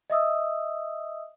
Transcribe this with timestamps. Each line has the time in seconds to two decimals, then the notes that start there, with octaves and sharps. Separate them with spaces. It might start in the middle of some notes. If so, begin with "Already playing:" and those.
0.10 D#5 E5 D#6 E6